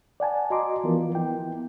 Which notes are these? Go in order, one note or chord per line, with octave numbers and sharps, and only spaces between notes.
D5 F#5 G#5 A5
F#4 D#5 A#5 C6 D6
E3 F3 B3 F4 A#4
B3 E4 G5